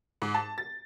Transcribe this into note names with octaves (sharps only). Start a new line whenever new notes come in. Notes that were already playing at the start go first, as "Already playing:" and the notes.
G#2
A5
A6